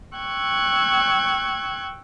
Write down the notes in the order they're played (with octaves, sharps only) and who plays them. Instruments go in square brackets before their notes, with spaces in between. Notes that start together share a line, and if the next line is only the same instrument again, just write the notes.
[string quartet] G5 C#6 E6 F#6 G#6